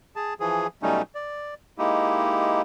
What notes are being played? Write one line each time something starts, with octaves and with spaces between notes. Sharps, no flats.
G#4 A5
E3 F3 G#4
B2 F#3 G3 A3 C#4 D#4
D5
G#3 A#3 D#4 E4 G4